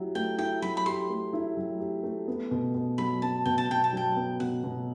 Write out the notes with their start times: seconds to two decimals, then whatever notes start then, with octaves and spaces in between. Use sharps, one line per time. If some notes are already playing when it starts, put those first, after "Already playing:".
Already playing: F#3 E4 G4
0.15 A3 G5
0.38 E4 G5
0.62 F#3 B5
0.77 B5
0.85 G4 C6
1.10 A3
1.33 E4
1.57 F#3
1.80 G4
2.04 A3
2.28 B3
2.51 B2
2.75 B2
2.98 F#3 B5
3.22 B3 A5
3.45 B2 G5
3.58 A5
3.69 B2 G5
3.84 A5
3.93 F#3 G5
4.16 B3
4.40 B2 F#5
4.64 B2